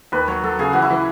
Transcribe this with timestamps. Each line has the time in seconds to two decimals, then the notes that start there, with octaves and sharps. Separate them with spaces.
0.12 D#2 B4
0.28 F#3 C#5
0.44 F#3 A4
0.59 C#3 G#4
0.73 E3 F#4
0.82 E4
0.90 E3